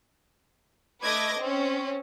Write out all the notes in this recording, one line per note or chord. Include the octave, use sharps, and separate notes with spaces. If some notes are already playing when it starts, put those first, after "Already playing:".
A3 B4 D#5 D6 G#6 A#6
C4 C#4